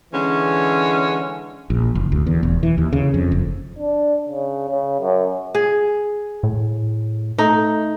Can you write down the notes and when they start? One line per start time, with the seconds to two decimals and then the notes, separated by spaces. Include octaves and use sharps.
0.14 D3 E3 G#3 C#4
1.70 A#1
1.95 F#1
2.12 D2
2.27 E2
2.43 E1
2.63 E3
2.78 D#2
2.93 C#3
3.14 F2
3.32 F#1
3.79 D4
4.29 C#3
4.69 C#3
5.01 F#2
5.55 G#4
6.43 A2
7.38 A3 D#4